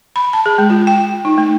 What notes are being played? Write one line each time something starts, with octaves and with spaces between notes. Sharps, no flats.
B5
A5
G#4
G#3
F4
G5
D#4
A3